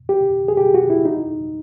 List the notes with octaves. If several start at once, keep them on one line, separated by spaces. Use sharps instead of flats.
G4
G#4
G4
F#4
E4
D#4